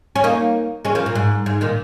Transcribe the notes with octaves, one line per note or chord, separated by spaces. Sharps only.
C#4
A#3 D#4
G#3 C#4
F3 A#3
A#2
G#2
G#2
A#2 D#3